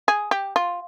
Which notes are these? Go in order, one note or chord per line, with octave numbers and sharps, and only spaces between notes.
G#4
G4
F4